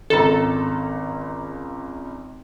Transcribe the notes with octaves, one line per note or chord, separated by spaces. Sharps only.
G#1 C#2 A4 A#5